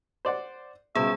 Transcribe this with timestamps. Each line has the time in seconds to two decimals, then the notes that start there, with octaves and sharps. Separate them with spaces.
0.25 C5 D5 F#5
0.95 C#2 B2 G3 G#4 E5